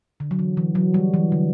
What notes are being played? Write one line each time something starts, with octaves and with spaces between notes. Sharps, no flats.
D3
F#3
E3
E3
F#3
G3
E3
D3